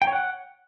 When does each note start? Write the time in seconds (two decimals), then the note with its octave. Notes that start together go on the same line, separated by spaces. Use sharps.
0.02 G5
0.07 C#5
0.13 F#5